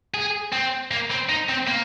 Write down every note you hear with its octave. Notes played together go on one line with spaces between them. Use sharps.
G#4
C4
A#3
C4
D#4
C4
A#3